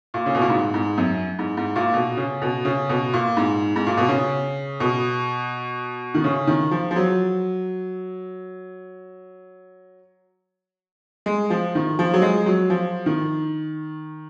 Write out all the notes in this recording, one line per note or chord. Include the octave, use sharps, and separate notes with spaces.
A#2
C#3
B2
A#2
G#2
G#2
F#2
G#2
G#2
A#2
B2
C#3
B2
C#3
B2
A#2
G#2
G#2
A#2
B2
C#3
B2
D#3
C#3
D#3
F3
F3
F#3
G#3
F3
D#3
F3
F#3
G#3
F#3
F3
D#3